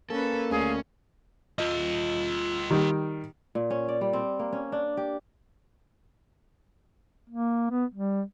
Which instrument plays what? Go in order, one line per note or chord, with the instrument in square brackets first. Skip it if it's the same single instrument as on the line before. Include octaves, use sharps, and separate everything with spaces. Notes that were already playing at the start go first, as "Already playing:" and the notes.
[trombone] A#3 [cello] C#4 B4 [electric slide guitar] A4
[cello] D2 [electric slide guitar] C#4 [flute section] G#4 F5
[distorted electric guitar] F4 D#5
[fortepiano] D#3 G3
[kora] A#2
C#4
D5
G3
C4
A#3
C#4
D4
G4
[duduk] A#3
B3
G3